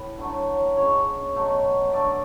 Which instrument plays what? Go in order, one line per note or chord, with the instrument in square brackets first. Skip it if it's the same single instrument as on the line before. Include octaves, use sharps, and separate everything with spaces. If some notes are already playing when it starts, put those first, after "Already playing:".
Already playing: [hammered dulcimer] A2 B4
D3 F#3 A3
C#3 G#3 C#5
B2 F#3 A3
D3 A3 D5